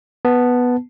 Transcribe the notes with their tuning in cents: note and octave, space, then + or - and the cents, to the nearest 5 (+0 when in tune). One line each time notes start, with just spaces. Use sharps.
B3 +0 A5 -5